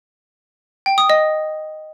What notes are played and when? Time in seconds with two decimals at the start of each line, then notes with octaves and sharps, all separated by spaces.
0.86 G5
0.98 D#6
1.10 D#5